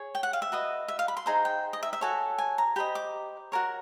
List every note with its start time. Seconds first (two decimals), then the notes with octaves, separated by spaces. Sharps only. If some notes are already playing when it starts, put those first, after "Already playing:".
Already playing: G#4 C#5
0.15 G5
0.23 F#5
0.33 F5
0.42 E5
0.52 F#4 B4 D#5
0.88 E5
0.99 F5
1.08 B5
1.17 C6
1.26 D#4 G#4 C5 A#5
1.45 G5
1.73 D#5
1.83 E5
1.93 E5
2.01 F#4 A4 C#5 G#5
2.38 G#5
2.58 A#5
2.76 G4 C5 D#5 B5
2.95 D6
3.52 F#4 A#4 C#5